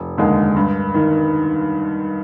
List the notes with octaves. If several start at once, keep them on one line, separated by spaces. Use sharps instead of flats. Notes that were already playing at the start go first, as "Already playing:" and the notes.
Already playing: F1
D#2 D3 G#3
G2
D#3